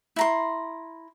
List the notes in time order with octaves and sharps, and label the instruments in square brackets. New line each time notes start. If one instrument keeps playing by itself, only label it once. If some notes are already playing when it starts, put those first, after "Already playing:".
[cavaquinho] E4 A#5 C6